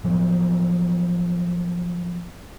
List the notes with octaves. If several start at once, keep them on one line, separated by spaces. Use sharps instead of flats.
A2 F3 F#3 B3